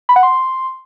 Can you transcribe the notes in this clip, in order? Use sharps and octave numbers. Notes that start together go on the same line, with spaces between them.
B5
F#5
C6